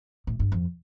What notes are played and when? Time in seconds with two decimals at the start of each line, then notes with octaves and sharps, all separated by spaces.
0.27 A2
0.40 G2
0.52 F2